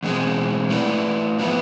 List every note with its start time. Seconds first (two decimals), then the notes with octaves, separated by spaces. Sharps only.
0.03 E2 B2 G#3 C4 G#4
0.70 A3 E4 B4 D5
1.39 F3 B3 E4 B4